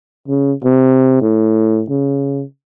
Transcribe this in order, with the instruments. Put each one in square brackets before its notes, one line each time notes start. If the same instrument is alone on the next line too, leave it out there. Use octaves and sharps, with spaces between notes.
[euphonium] C#3
C3
A2
C#3